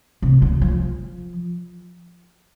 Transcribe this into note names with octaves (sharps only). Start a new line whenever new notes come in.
C3
D3
F3